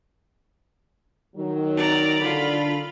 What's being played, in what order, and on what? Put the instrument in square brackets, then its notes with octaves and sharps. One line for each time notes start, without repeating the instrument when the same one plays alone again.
[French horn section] D#3 F#3
[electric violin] D5 A#5
[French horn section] D3 [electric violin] F4 B5